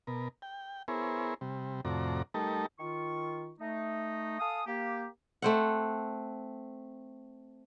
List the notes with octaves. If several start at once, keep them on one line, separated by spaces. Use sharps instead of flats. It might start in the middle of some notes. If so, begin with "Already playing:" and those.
B2 A#4
G5
B3 E4 G#4 A#4 C5 C#5
C3 G3
F2 A2 C3 F#4 D5 A#5
G3 A3 D#4 A4 A#4
D#3 F4 C#6
A3 D#4
A4 F5 G#5 D#6
A#3 G4
A3 C4 F#5